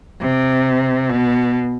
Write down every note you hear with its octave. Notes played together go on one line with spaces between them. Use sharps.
C3
B2